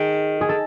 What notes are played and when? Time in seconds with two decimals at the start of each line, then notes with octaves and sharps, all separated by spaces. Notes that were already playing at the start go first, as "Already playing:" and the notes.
Already playing: D#3 G#4
0.41 G#4
0.49 A4